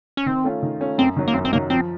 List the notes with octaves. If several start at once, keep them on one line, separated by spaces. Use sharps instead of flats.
C#4
D#3 C4
A3 C#4 F4
D#3
A3 C#4 F4
F#2 C4
D#3 F#3
A#3
F#2 C4
C4
D#3 F#3 A#3
F3 C4